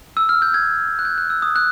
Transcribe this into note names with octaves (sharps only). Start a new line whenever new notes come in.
E6
F6
G6
G#6
F#6
G6
F#6
E6
D#6
F#6